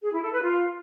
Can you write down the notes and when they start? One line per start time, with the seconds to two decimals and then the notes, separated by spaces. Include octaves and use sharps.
0.02 G#4
0.12 E4
0.22 A4
0.32 B4
0.42 F4